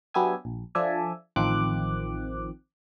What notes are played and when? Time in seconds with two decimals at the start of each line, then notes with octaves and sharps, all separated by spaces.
0.14 F#3 B3 D4 G4 E5 G#5
0.45 A#1
0.75 F3 D4 A4 D5 E5 G#5
1.36 A1 D#3 F3 C4 D6 F#6